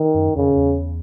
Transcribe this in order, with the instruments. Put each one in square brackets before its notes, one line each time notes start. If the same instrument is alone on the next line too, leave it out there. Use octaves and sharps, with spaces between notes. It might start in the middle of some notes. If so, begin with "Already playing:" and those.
Already playing: [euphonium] D#3
[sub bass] F#2
[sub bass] F2 [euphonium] C#3
[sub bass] E2